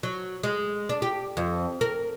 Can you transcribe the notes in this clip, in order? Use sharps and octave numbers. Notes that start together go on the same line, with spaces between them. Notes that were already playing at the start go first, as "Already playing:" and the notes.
F#3
G#3
D4
G4
F2
A#4